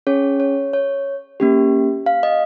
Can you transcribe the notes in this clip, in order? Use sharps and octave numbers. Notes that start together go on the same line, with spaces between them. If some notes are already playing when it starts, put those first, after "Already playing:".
C#4 G#4 C#5
C#5
C#5
A#3 C#4 G4
F5
D#5